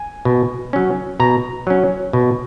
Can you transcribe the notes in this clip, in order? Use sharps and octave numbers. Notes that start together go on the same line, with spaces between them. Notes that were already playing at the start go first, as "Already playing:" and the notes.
Already playing: G#5
B2
F#3 C#4
B2 A#5
F#3 C#4
B2